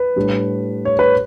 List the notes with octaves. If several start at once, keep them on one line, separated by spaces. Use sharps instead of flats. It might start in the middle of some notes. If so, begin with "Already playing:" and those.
Already playing: B4
A2 G3 D4
C#5
B4